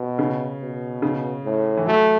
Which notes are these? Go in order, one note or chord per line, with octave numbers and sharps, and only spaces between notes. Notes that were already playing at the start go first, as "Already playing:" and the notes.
Already playing: B2
C#3
B2
C#3
A2
E3
F#3 A3